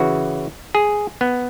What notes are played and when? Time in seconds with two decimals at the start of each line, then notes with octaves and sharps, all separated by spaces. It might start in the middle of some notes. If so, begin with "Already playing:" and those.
Already playing: C#3 E3 F#4
0.75 G#4
1.21 B3